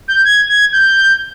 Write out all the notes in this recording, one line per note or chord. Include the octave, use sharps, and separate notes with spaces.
G6
G#6
G#6
G6